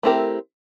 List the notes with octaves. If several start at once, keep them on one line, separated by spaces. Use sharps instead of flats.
A3 C4 E4 G4 A#4